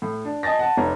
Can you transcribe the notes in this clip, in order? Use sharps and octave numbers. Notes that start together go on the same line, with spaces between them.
A2
D4
D#5 G#5 A5 A6 A#6
F#5 A5
F1 C#5 A#5